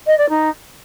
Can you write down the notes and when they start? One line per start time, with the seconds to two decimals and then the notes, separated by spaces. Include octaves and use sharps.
0.06 D#5
0.18 D5
0.29 D#4